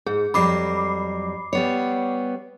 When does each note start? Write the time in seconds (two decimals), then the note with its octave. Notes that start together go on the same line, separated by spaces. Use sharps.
0.07 G#2 G#4
0.34 F2 F#3 G3 B5 D6 C7
1.53 G3 B3 C#5